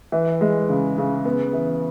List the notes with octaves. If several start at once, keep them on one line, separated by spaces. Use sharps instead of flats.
E3
G#3
C#3
C#3
B3
E3